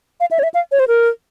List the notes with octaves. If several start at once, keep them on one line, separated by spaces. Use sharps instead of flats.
F5
E5
C#5
E5
F5
C#5
C5
A#4